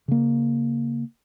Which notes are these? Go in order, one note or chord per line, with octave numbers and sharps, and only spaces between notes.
C#3 A#3